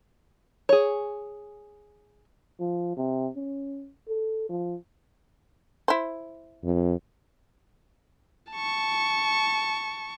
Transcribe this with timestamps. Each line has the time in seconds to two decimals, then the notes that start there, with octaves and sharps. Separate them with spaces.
0.69 G#4 C#5
2.60 F3
2.97 C3
3.36 C#4
4.08 A4
4.49 F3
5.88 E4 C5
6.64 F2
8.53 A5 C#6